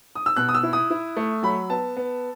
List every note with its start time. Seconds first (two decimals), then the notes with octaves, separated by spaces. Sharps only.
0.15 D#6
0.26 E6
0.36 B2 F#6
0.49 D#6
0.55 E6
0.63 E4
0.73 D#6
0.91 E4
1.17 A3
1.43 F#3 B5
1.70 B3 A5
1.97 B3